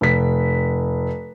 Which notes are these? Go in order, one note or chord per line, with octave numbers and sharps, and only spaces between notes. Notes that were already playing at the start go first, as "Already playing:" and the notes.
F1 B6